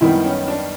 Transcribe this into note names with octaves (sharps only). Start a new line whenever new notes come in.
F#2 D#3 G3 B3 E4
C#4
D4